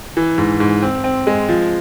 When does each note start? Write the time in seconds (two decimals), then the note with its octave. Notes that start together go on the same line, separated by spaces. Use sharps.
0.17 E3
0.38 G#2
0.60 G#2
0.83 C4
1.04 C4
1.27 G#3
1.49 F3